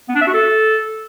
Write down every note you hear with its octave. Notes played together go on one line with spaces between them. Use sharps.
B3
D4
E5
F#4
A4